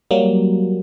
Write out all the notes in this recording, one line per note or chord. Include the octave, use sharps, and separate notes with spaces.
F#3 G3 A#3